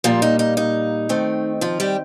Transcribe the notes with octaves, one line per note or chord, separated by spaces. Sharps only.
A#2 F3 G3 A#3 F4
D#4
D#4
D#4
D#3 A3 C4
F3 F4
G3 G4